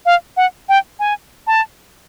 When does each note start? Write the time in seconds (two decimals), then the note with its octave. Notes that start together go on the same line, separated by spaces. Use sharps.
0.06 F5
0.37 F#5
0.69 G5
0.99 G#5
1.47 A5